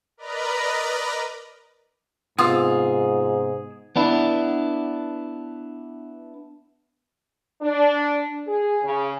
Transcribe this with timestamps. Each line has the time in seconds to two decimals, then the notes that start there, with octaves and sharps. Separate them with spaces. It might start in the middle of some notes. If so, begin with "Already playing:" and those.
0.17 A#4 B4 D5 D#5 A#5 B5
2.39 G#2 C3 B3 F4 G#4 D#6 E6
3.96 B3 D4 E4
7.62 D4
8.47 G#4
8.83 C#3